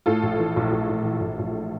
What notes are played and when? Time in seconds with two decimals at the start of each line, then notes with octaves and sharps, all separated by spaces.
0.06 A2 F4 A4
0.23 A#1
0.39 E3
0.56 A#1
0.72 A#1
0.89 A2
1.05 E3
1.21 A#1
1.39 A#1